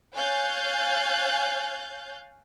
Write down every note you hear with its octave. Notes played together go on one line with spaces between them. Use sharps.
C#5 F5 G#5 F#6 G6 A6